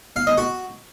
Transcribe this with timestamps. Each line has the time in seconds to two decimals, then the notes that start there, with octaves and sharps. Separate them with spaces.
0.16 F5
0.27 D#5
0.38 F#4